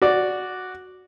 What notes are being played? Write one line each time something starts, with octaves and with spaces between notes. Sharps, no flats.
F#4 D5